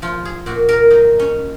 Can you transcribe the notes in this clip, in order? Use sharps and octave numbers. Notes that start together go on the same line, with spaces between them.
F3 F4
G#4
A#2 F#4
A#4
F#3 D#4
C#4